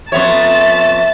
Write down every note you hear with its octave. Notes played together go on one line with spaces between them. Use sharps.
F2 B3 C#5 E5 A5